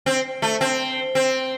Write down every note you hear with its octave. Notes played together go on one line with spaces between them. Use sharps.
C4
A3
C4
C4